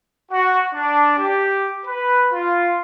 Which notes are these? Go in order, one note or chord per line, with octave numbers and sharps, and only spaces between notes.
F#4
D4
G4
B4
F4